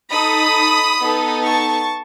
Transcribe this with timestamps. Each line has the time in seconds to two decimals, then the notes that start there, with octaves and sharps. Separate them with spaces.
0.12 D#4 A4 B5 D#6
1.00 B3 D#4 A4
1.45 A5 C#6